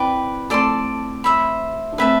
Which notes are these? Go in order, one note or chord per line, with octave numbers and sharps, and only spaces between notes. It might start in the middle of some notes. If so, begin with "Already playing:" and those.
Already playing: C4 E4 B4 D5 G5
A3 C4 A4 D5 A5 C6
C5 E5 B5
D4
A3 C4 B4 E5 A5